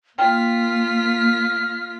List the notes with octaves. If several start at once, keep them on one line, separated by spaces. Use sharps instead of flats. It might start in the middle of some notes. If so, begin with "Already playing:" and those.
A#3 F4 G5 F6 B6